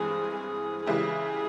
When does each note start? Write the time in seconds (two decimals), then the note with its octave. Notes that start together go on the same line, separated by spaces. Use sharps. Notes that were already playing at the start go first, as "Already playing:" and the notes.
Already playing: G2 E3 G#3 C4 G#4
0.34 G#4
0.86 C#3 E3 G#3 E4 G4 G#4